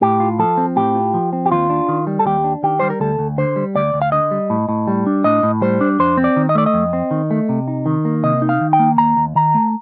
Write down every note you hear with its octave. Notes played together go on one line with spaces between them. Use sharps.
A2 G4
F4
F3 A4
C4
A2 G4
F4
F3
C4
G4
D#2 F4
D4
D#3
G3
A4
D#2 G4
D4
D#3 G4
G3 C5
A#4
D2 A4
D2
D3 C5
G3
D2 D5
D2
F5
D3 D#5
G3
A2
A2
G3
D4
A2 D#5
A2
G3 C5
D4
F2 C5
C4
D5
D#3
D#5
A3 D5
D#5
F2
C4
D#3
A3
C3
D#4
D#3
A#3
C3 D#5
D#4
F5
D#3
G5
A#3
D#2 A#5
D#2
D#3 A#5
A3